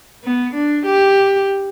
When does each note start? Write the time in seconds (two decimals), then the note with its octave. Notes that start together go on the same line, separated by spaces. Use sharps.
0.24 B3
0.54 D4
0.85 G4